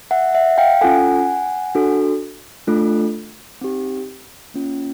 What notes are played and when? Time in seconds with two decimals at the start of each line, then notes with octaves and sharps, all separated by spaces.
0.11 E5 F#5
0.35 E5 F#5
0.58 F5 G5
0.81 C#4 F4 A4 F#5 G#5
1.75 D4 F#4 A4
2.67 A3 D4 F4 A4
3.61 C4 D#4 G4
4.54 A#3 C#4 F4